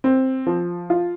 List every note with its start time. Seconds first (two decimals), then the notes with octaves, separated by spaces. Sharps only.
0.04 C4
0.47 F3
0.90 F4